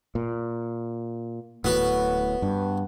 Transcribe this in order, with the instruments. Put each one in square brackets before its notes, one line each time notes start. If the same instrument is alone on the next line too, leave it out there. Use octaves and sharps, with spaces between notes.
[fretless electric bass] A#2
[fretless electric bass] D1 A2 [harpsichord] B3 F#4
[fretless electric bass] G2